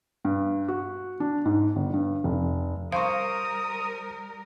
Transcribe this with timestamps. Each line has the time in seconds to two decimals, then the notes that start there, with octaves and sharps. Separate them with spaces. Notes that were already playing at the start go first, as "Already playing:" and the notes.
0.25 G2
0.68 F#4
1.20 D4
1.45 G#2
1.76 G1
1.94 G2
2.24 F1
2.92 G3 A#4 C5 F5 C6 C#6 D#6